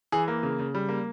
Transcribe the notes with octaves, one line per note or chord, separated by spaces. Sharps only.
E3 G#4
A#3
C#3
C#3
G3
A#3